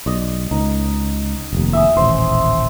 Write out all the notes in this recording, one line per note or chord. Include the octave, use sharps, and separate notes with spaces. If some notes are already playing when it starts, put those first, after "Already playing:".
B1 D5 D#5
C#2 D#4
F1 D#2
E5 G#5 D#6
D#1 A1 C5